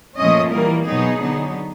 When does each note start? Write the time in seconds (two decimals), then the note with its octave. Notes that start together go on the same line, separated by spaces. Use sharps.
0.17 A#2 F3 A3 C#4 D#5
0.51 E3 G3 A#3 A#4
0.86 B2 F#3 B3 D#4 G#4
1.19 D3 F#3 B3 D#4